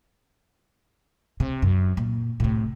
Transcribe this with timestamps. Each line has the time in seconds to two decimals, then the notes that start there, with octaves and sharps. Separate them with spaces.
1.40 C3
1.62 F#2
1.97 A#2
2.40 A2 C3